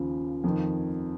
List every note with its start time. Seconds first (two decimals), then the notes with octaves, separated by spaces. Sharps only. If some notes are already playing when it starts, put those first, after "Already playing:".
Already playing: D#2 C#3 F3
0.44 F2 D#3